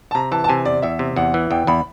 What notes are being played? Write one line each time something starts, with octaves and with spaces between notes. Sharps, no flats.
A5
C3 A#5
E3 A5
A5
C3 G#5
E2 D5
E2 E5
C3
E2 F#5
E3
E2 G5
E2 B5